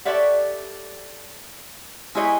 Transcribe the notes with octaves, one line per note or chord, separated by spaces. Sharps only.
G4 A4 C#5 D5 E5 F#5
G#3 E4 G4 G#4 C#5 D#5